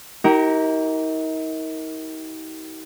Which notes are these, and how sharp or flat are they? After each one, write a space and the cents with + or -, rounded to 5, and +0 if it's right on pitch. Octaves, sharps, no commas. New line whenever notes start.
D#4 +40 G4 -35 A#4 +0